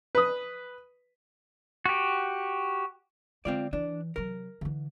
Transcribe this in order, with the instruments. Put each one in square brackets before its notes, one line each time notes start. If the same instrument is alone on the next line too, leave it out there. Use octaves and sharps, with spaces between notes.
[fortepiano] B4 D#6
[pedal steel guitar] F#4 G4
[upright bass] D3 G#3 [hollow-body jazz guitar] C4 F4 D5
[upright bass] E3 [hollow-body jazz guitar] D4
[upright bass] C3 F#3 [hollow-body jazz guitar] A#4
[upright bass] D3 E3